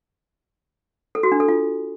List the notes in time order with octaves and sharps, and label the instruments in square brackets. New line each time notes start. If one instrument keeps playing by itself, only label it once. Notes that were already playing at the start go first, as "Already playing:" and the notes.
[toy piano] A4
F#4
D4
A4
F4